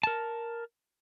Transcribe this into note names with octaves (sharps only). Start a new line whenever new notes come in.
A#4 A5